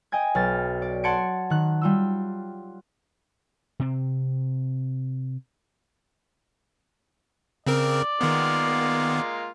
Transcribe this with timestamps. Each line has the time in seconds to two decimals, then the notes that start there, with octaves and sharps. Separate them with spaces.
0.12 D#5 G5 G#5 G#6
0.35 B1 F6 A6
0.82 D5
1.04 F#5 A5 C6 G#6 C#7 D7
1.50 D#3 F#6
1.81 G3 F4 E6
3.80 C3 C4
7.67 C#3 C4 A#4 D5
8.21 D#3 G#3 A#3 B3 F4